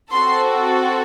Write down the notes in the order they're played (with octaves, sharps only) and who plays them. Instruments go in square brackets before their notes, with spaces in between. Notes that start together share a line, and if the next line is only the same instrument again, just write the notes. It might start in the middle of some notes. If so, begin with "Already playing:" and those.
[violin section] C4 F#4 A4 C6